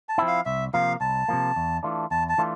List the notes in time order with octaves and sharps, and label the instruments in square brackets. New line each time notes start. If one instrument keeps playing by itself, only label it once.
[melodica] A5
[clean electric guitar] F3 C4 E4
[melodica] F5
[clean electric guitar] C2 [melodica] E5
[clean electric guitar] C3 F3 A#3 [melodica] F5
[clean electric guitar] C2 [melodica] A5
[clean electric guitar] C3 F3 A#3
E2
E3 A3 D4 F4
[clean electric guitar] E2 [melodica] A5
[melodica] A5
[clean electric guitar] E3 A3 D4 F4